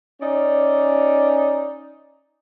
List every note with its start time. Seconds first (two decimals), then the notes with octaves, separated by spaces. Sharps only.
0.21 C#4 D#4 D5